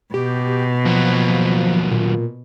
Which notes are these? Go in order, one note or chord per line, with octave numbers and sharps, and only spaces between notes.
B2 G4
D#2 F3 F#3
A#2